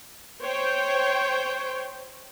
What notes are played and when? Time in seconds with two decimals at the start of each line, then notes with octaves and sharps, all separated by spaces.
0.41 C5 C#5 G5